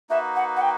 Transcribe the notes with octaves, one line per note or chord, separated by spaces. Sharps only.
A#3 D#4 F#4 B4 E5
F#5
F#5
G5